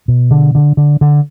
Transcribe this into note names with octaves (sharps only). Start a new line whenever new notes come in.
B2
D3
D3
D3
D3